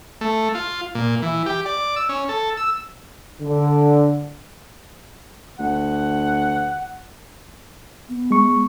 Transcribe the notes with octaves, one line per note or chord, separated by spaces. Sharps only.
A3
F4
A#2
E3
G4
D5
E6
C#4
A4
E6
D3
D2 F#5
B3
G#3 C#6